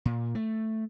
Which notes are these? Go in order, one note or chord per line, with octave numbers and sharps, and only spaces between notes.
A#2
A3